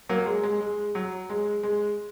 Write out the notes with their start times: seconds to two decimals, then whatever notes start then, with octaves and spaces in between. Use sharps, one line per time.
0.09 F#3 A#3
0.26 G#3
0.43 G#3
0.60 G#3
0.95 F#3
1.30 G#3
1.63 G#3